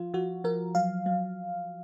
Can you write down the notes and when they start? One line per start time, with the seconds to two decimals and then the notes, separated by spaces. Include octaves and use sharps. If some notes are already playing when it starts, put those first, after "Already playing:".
Already playing: F3 F4
0.14 F3 F#4
0.44 F3 A#4
0.75 F#3 F5
1.06 F#3